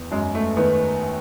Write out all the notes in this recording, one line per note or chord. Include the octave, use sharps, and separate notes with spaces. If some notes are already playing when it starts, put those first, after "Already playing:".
Already playing: E2 D#3
F#2 G#3
A3
D#3 B3